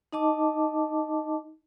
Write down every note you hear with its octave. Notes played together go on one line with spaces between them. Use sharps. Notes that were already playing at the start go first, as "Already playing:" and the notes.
D#4 D#5 A5 D6